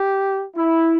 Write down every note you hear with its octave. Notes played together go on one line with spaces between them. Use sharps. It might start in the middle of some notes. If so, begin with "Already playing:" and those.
Already playing: G4
E4